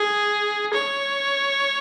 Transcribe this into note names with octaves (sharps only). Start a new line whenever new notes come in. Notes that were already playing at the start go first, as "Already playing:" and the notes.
Already playing: G#4
C#5